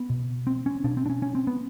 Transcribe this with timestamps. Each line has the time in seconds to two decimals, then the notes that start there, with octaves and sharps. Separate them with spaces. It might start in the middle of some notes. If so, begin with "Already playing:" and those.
Already playing: B3
0.10 B2
0.47 C4
0.66 C#4
0.84 B2 D4
0.97 C4
1.06 D4
1.10 C#4
1.22 C#4
1.35 C4
1.47 B3